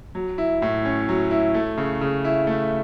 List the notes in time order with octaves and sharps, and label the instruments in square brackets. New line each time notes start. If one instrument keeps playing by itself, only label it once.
[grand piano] F#3
E4
A2
C#4
F#3
E4
A3
C#3
C#3
E4
A3